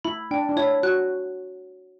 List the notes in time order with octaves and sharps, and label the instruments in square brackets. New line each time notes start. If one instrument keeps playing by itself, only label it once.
[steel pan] E4 [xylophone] B5
[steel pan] D4 [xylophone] G5
[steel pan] D4
[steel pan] E4 [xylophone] C#5
[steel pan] F#4 [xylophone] F#6